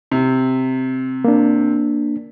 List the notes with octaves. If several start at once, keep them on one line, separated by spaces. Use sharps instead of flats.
C3
A#3 D4